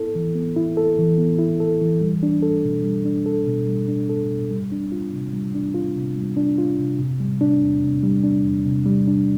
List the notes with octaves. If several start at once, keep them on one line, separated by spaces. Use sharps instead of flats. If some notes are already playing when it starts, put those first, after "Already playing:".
Already playing: B3 E4 A4
E3
B3
E4
A4
E3
B3
E4
A4
E3
G3
D4
A4
B2
G3
D4
A4
B2
G3
D4
A4
B2
G3
D4
F4
C3
G3
D4
F4
C3
G3
D4
F4
C3
C3
G3
D4
E2
C3
G3
D4
E2
C3
G3
D4